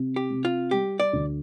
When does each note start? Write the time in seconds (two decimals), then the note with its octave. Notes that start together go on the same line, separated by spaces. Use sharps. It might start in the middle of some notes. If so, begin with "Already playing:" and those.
Already playing: C3
0.16 G4
0.30 C3
0.45 F4
0.71 G3 G4
1.00 D5
1.13 D2